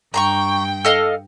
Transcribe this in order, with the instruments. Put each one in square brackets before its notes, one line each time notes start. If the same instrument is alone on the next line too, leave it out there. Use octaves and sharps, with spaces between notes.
[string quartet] G2 G5 [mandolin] A#5 C6 C#6
[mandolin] A4 D#5 F5